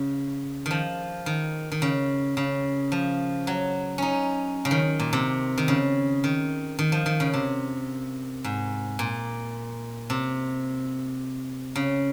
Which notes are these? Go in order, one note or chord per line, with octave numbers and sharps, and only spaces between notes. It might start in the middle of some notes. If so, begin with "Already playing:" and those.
Already playing: C#3
D#3 F3
D#3
D#3
C#3
C#3
F3
F#3
C#4 D#4
C#3
D#3
A#2
C3
D#3
C#3
D#3
D#3
F3
D#3
C#3
C3
G#2
A#2
C3
C#3